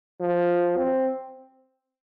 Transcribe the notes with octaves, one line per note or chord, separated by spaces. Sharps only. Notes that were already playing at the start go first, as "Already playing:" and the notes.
F3
C4